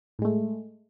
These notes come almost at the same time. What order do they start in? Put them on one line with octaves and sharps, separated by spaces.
A2 G#3 A3